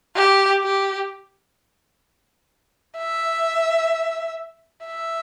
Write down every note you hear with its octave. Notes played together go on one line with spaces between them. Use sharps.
G4
G4
E5
E5